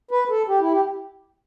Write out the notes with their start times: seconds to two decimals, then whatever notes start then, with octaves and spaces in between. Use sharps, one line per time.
0.11 B4
0.30 A4
0.48 G4
0.60 E4
0.72 G4